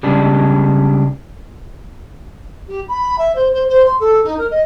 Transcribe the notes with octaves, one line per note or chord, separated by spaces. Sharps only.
C#3 G3 G#3 D4
G4
B5
E5
C5
C5
C5
C6
A4
D#4
A#4
D#5